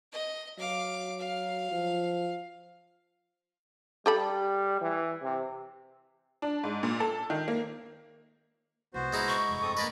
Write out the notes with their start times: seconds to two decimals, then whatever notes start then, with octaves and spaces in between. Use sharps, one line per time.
0.13 D#5
0.59 F#3 F5 D6
1.19 F5
1.72 F3
4.06 G3 G4 A4 B5
4.81 E3
5.22 C3
6.42 D4
6.63 G#2
6.83 A#2
7.00 A4
7.30 D#3
7.48 A#3
8.94 C2 B3 F#4 C5
9.13 A#2 G#3 D#4 E4
9.28 C#6
9.49 F1 G2
9.62 C4 A4 D#6
9.77 A#3 D4 B4 D#5 B5